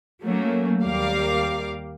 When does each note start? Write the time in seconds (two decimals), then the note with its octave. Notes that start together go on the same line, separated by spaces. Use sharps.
0.22 F#3 A3 A#3 C#4
0.83 D#2 G3 A#4 F5 D6